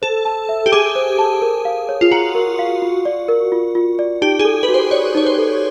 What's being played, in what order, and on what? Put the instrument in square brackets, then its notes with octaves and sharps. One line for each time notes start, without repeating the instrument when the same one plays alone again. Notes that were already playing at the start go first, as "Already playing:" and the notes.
[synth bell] A4 [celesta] C5
[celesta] A5
E5
[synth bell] G4
[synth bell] G#4 [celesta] D6
[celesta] C5
A5
A#4
F5
C#5
[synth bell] F4
[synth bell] F#4 [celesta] A#5
[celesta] A#4
F5
F4
D5
A#4
F4
F4
D5
[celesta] D#4 [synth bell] G4
[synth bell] G#4
[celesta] A4
[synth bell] B4
[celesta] F#4
[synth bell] C5
[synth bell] C#5 [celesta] D5
[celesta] D#4 [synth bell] C#5
[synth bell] C5
[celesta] A4